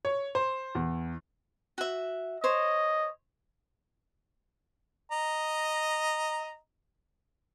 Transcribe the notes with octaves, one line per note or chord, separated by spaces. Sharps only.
C#5
C5
E2
F#4 E5
C5 C#5 D#5
D#5 A#5